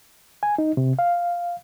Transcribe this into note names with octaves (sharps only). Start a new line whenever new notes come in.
G#5
D#4
C3
F5